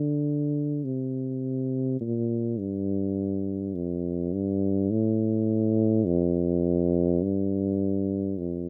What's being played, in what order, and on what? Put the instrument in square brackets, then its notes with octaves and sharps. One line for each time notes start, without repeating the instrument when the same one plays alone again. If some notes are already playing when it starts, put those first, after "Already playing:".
Already playing: [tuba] D3
C3
A#2
G2
F2
G2
A2
F2
G2
F2